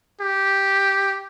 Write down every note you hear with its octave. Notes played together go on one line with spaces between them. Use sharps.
G4